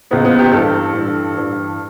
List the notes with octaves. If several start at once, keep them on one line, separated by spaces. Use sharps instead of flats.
C#2 C#3 E3 B3
B3
G4
G2 E3 A4
G2 E3
G2 E3